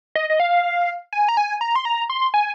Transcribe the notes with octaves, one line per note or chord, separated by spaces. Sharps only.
D#5
D#5
F5
G#5
A#5
G#5
A#5
C6
A#5
C6
G#5